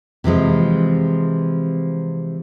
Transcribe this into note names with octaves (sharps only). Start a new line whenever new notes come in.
C3 E3 F3 G#3